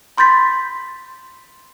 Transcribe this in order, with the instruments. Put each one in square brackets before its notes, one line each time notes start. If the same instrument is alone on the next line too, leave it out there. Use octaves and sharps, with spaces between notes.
[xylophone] B5 C6 G6 A6 B6